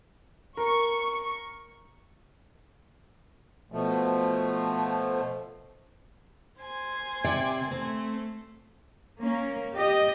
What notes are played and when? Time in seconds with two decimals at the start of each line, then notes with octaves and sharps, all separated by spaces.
0.57 A#4 C#6
3.72 B2 F3 A3
6.61 C5 G#5
7.24 C3 D5 G5
7.71 A3 C4
9.19 A#3 C#4
9.72 G4 D#5